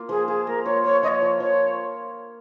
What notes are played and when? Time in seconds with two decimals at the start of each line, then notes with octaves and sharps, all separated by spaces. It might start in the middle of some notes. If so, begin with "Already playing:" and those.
Already playing: A#3 F4
0.09 F3 G#4
0.28 F4 G#4
0.46 A#3 A#4
0.65 F4 C#5
0.84 A#3 C#5
1.03 F3 D#5
1.08 C#5
1.22 F3
1.40 F3 C#5